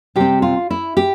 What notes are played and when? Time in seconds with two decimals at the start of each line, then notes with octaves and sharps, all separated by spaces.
0.16 C3 G3 C4 G4
0.42 F4
0.71 E4
0.97 G4